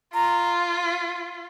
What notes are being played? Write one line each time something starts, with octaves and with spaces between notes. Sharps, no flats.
F4 A#5